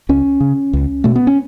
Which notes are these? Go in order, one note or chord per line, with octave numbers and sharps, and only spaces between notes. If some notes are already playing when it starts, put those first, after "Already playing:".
C#2 C#4
C#3
C#2
B2 A3
B3
C#4